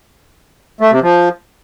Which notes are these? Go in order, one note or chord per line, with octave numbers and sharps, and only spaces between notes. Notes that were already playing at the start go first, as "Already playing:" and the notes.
A3
C3
F3